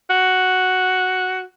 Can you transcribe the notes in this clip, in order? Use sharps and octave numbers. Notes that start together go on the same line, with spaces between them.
F#4